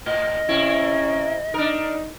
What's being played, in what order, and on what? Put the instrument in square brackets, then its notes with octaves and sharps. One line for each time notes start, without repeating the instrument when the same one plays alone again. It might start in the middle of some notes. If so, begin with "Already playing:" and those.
[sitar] A2 [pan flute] D#5
[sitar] C3 A#3 E4 [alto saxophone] C#4
[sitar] D4 A#4 [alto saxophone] D#4